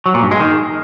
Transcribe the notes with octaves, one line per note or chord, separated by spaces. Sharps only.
F#3
A#2
G2
G#3
D#3